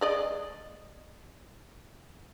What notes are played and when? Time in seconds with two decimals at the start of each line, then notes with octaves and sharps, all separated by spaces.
0.01 G#3 D5 D#5